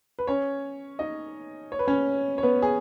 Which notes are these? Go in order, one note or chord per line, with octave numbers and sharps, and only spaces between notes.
B4
C#4 C#5
D#4 D#5
C#5
B4
C#4 C#5
C#5
B3 B4
G#4